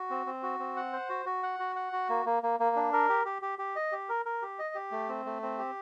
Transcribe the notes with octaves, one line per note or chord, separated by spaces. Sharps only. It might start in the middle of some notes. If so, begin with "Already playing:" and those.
Already playing: F#4
C4
C4
F#4
C4
F#5
C5
F#4
F#4
F#5
F#4
F#5
F#4
A#3
A#3
A#3
A#3
D4
A#4
G4
G4
G4
G4
D#5
G4
A#4
A#4
G4
D#5
G4
A3
C4
A3
C4
G4